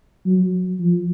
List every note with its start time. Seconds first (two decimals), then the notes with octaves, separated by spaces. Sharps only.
0.26 F#3
0.80 F3